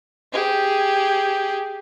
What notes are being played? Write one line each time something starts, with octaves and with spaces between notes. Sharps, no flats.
G4 G#4